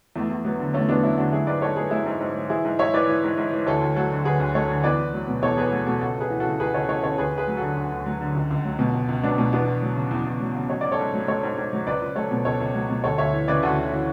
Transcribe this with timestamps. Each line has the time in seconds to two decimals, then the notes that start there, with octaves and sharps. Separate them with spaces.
0.16 E2 A3
0.30 E2
0.45 F#3 B3
0.59 D3
0.74 E2 A3 C#4
0.89 E2 B3 D4
1.03 F#3 C#4 E4
1.18 D3 D4 F#4
1.32 F#3 E4 G#4
1.47 G#2 B4 D5
1.62 G#2 A4 C#5
1.76 F#3 G#4 B4
1.91 F#3 E4 G#4
2.06 G#2
2.20 G#2
2.35 F#3
2.50 E3 E4 G#4
2.65 G#2
2.79 G#2 C#5 E5
2.93 E3 B4 D5
3.09 E3
3.24 G#2
3.38 G#2
3.52 E3
3.66 D2 A4 C#5
3.81 D2
3.96 F#3 F#4 A4
4.11 D3
4.25 D2 G#4 B4
4.39 D2
4.55 F#3 A4 C#5
4.70 D3
4.84 E2 B4 D5
4.98 E2
5.13 F#3
5.28 B2
5.42 E2 A4 C#5
5.57 E2 G#4 B4
5.72 F#3 F#4 A4
5.86 B2 F#4 A4
6.01 C#2 F#4 A4
6.16 C#2 G#4 B4
6.30 E3
6.40 F#4 A4
6.45 C#3
6.60 C#2 G#4 B4
6.74 C#2 A4 C#5
6.89 E3 A4 C#5
7.03 C#3 A4 C#5
7.18 D2 G#4 B4
7.33 D2 G#4 B4
7.48 F#3
7.57 F#4 A4
7.62 D3
7.77 D2
7.92 D2
8.06 F#3
8.21 D3
8.35 C#2
8.51 C#2
8.65 F#3
8.79 B2
8.94 C#2
9.09 C#2
9.23 F#3 B3 D4
9.38 B2
9.53 E2 B3 D4
9.67 E2
9.82 F#3
9.96 C#3
10.11 E2
10.26 E2
10.40 F#3
10.55 C#3
10.70 F#3 C#5
10.81 G#2 D5
10.92 A4 C#5
10.99 G#2
11.14 F#3
11.28 F#3 A4 C#5
11.43 G#2
11.57 G#2
11.73 F#3
11.86 C#2 B4 D5
12.02 C#2
12.16 F#3 A4 C#5
12.31 B2
12.45 C#2 A4 C#5
12.60 C#2
12.75 F#3
12.90 B2
13.04 D2 A4 C#5
13.18 D2 C#5 E5
13.33 E3
13.48 C#3 B4 D5
13.63 D2 F#4 A4
13.78 D2
13.92 E3